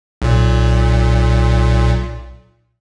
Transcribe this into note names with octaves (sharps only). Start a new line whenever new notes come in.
B1 A#2